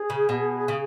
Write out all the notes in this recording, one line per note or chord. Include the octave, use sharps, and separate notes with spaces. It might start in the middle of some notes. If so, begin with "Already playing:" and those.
Already playing: G#4
C#3
B2
C#3